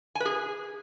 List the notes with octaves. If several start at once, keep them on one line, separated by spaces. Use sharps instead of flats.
G#5
B4
G#4